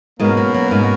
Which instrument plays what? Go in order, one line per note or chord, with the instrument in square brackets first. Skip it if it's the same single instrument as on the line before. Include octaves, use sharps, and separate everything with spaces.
[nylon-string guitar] G#2 G#3 [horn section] B2 A#3 C#4 F#4 A#4
[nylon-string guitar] F#3
F#3
G#2 G#3